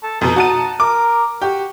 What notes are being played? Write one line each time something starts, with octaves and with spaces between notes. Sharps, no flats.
A4
F2 B2 D#4
F#4 A5 D#7
A#4 D6
F#4 G4